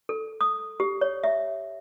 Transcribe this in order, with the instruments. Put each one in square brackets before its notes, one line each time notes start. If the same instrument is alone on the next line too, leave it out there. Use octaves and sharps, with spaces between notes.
[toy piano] A4
D#6
G4
C#5
E5